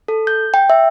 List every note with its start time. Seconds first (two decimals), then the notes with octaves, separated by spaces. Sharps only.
0.08 A4
0.27 G6
0.54 G5
0.70 E5